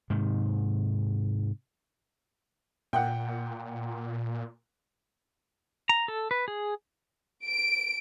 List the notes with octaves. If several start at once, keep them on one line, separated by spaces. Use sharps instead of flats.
G#2 C3 D#3
A#2 F#5 G5
A#5
A4
B4
G#4
D7